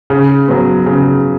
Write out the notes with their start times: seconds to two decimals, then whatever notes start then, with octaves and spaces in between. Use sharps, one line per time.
0.10 C#3
0.48 F#3 B3
0.86 C#3